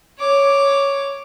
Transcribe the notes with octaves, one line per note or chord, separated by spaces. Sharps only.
C#5 D6